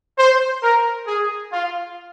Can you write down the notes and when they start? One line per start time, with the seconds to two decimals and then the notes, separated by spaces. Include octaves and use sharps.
0.18 C5
0.63 A#4
1.07 G#4
1.52 F4